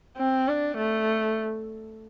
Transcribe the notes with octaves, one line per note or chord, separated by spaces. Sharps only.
C4
D4
A3